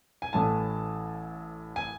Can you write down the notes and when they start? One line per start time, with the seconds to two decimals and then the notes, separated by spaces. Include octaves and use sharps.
0.22 G#5
0.33 A1 A2 E3 A3 A5
1.76 G#5